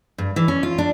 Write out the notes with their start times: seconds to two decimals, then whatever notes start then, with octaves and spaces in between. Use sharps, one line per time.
0.18 G2
0.36 E3
0.48 C#4
0.63 F4
0.78 D4